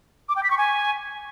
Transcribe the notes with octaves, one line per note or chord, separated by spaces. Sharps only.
D6
G5
B6
C#6
G#5